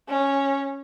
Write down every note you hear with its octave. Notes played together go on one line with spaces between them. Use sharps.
C#4